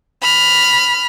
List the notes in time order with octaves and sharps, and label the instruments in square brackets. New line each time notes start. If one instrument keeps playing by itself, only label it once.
[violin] B5 F6